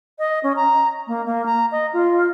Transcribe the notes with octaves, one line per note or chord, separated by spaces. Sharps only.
D#5
C#4
A#5
A#3
A#3
A#5
D#5
F4